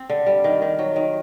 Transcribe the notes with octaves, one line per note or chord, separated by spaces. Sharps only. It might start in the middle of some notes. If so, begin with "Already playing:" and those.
Already playing: C4
D3
G3
D#3
D#3
F#3
D#3